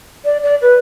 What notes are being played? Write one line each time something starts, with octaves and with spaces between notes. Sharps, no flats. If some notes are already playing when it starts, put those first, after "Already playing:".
D5
D5
B4